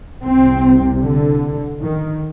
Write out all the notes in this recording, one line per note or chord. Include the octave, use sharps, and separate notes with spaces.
C2 C3 C4
D3
D#3